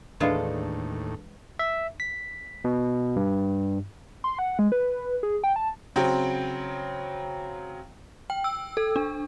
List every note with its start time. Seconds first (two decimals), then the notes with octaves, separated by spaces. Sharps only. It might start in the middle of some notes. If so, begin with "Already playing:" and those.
0.20 D#2 A2 E3 G#3 D4 F4 A4
1.59 E5
2.00 B6
2.64 B2
3.16 G2
4.24 C6
4.39 F#5
4.59 G#3
4.72 B4
5.23 G#4
5.44 G5
5.56 A5
5.96 C#3 F#3 C4 G5
8.30 G5
8.44 E6
8.77 A4
8.96 D4